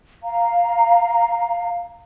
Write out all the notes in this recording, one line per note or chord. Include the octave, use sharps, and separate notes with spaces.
F5 A#5